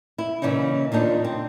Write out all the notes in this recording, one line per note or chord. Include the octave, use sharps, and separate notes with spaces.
E4
A#2 C#3 E3 C#4 D#4
D#2 A#2 D4 D#4
C4